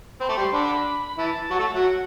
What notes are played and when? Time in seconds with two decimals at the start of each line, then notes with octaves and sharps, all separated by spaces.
0.20 C4 C5 B5
0.29 A3 A4 D6
0.37 G3 G4 C6
0.53 D3 D4 B5
1.18 E3 E4 A5
1.50 F#3 F#4
1.59 A3 A4
1.74 F#3 F#4 E5
1.83 F#5